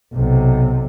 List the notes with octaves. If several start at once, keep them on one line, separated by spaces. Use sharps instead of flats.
B1 C3